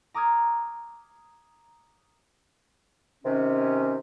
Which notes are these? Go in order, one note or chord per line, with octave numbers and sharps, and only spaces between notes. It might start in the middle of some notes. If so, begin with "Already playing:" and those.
A#5 D6 D#6 F6 G#6
C3 D#3 C#4